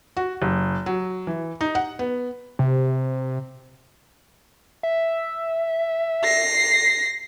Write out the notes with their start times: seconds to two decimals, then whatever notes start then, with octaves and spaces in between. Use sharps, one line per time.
0.17 F#4
0.42 F#1
0.86 F#3
1.27 E3
1.61 D#4
1.75 F#5
1.99 B3
2.59 C3
4.83 E5
6.24 A#6 C7